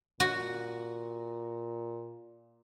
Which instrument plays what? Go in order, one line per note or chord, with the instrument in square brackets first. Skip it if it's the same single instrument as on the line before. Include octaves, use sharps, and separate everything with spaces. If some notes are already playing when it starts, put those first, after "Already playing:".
[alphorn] A#2 [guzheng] F#4